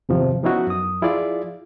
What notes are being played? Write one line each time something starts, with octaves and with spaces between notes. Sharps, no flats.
E2 G2 C3 D#3 F3
F3 B3 C#4 D#4 E4 F#4
F#2 D#6
F3 E4 F4 G#4 D5 F5